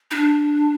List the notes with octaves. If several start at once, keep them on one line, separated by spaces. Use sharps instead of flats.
D#4
D4